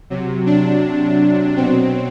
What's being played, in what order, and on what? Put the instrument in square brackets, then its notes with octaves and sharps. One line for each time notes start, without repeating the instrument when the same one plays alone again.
[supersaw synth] C3 F#3
D4
B2 F#3 C4